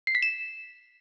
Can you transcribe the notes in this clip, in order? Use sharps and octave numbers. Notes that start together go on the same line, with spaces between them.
C7
B6
E7